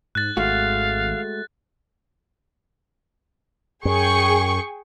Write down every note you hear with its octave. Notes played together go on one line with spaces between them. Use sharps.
G#2 F#6 A6
G#1 G#3 A3 F#4 F5
F#2 G#4 G5 C#6